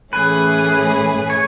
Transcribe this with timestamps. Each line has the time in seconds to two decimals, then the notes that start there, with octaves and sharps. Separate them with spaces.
0.13 A2 E3 A3 C#4 G#4 B4
1.30 C#5